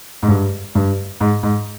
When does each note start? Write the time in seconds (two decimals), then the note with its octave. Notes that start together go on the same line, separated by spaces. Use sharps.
0.23 G#2
0.28 G2
0.75 G2
1.21 G#2
1.43 G#2